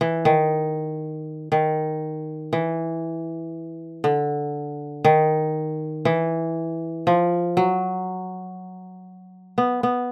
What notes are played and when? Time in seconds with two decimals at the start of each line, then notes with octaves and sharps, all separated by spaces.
0.01 E3
0.25 D#3
1.52 D#3
2.53 E3
4.04 D3
5.04 D#3
6.05 E3
7.07 F3
7.57 F#3
9.58 B3
9.83 B3